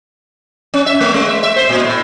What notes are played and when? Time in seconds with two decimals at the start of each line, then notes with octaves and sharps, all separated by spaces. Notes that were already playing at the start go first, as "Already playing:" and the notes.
0.74 C#4
0.86 E5
1.01 A3
1.14 G#3
1.28 E5
1.43 E5
1.56 C5
1.69 A#2
1.84 A2